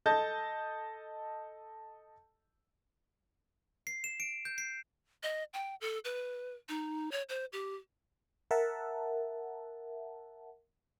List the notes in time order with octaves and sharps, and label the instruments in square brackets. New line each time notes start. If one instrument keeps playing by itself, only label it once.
[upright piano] A4 D#5 A5 G6
[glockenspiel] C7
E7
D7
G6
C7
[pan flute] D#5
G5
A4
B4
D#4
C#5
C5
G4
[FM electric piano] A#4 E5 F#5 A5